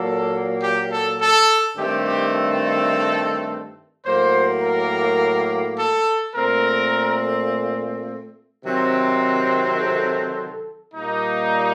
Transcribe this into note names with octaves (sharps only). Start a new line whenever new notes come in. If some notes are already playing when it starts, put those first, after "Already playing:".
Already playing: A#2 F#3 A#3 A4
G4
A4
A4
G2 D#3 A3 C4 G4
G4
A4
A2 F#3 A#3 C5
A#4
A4
A#2 A3 C4 A#4
C3 D#3 F#3 C4
A4
A#2 G3 A#3 D#4